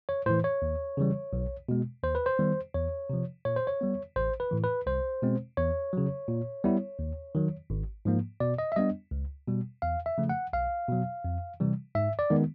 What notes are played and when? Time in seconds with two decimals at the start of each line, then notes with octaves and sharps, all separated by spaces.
0.09 C#5
0.26 A2 E3 C5
0.44 C#5
0.62 D#2
0.97 C#3 E3 G3
1.33 B1
1.69 B2 G#3
2.03 D#2 C5
2.15 B4
2.26 C5
2.39 D#3 G3 B3
2.74 E2 C#5
3.10 C3 F3
3.45 A#2 C#5
3.56 C5
3.67 C#5
3.81 G3 B3
4.16 A1 C5
4.40 B4
4.51 A2 E3
4.64 B4
4.87 C2 C5
5.22 B2 G#3 C4
5.57 E2 C#5
5.93 C#3 F#3
6.28 A#2
6.64 G3 B3 E4
6.99 D#2
7.35 D#3 F#3
7.70 G#1
8.05 G#2 F3 A#3
8.40 B2 D5
8.58 D#5
8.72 E5
8.76 G3 B3 D4 D#5
9.11 C#2
9.48 B2 G3
9.82 E2 F5
10.06 E5
10.18 C#3 F3 A3
10.29 F#5
10.53 B1 F5
10.89 B2 F#3
11.25 F2
11.60 C3 E3 G3
11.95 G#2 E5
12.19 D5
12.30 D#3 G#3 B3